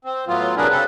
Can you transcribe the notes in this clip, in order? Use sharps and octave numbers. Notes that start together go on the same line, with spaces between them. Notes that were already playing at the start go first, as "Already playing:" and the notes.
C4
A2 F#3 B3 F4
C3 F#3 D4 G#4 A#4 B4
C#3 C4 A4 B4